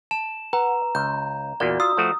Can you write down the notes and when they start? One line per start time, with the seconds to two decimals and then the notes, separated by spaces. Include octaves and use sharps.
0.11 A5 E7
0.53 B4 F#5 A#5
0.95 C#2 G6
1.60 E2 A#2 A#3 F#4 D5
1.80 F4 D#6 E6
1.97 F3 A3 F#4